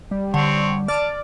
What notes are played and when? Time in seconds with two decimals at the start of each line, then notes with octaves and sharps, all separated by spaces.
0.11 G3
0.34 D3 C4 C#5
0.88 D5 A5 D6 F6